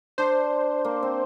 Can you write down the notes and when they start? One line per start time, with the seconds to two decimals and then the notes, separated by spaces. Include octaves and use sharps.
0.18 D4 C5
0.85 A#3
1.03 C4